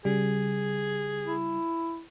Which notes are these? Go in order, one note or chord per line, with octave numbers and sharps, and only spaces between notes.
C#3 G3 G#4
E4